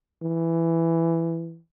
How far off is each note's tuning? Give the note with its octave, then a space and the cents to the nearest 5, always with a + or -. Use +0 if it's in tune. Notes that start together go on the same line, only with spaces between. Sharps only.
E3 +10